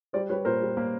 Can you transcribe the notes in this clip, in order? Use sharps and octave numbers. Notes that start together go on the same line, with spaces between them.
G3 C5 D5
G3 B4 C#5
A#2 A#4 C5
G3
A#3